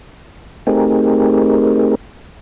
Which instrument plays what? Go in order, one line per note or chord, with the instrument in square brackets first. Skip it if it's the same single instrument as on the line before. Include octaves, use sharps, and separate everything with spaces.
[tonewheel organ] A3 C4 D#4 G4 G#4 A#4